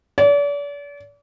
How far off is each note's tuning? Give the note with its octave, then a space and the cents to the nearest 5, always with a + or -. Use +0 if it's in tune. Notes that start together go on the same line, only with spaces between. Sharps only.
D5 -40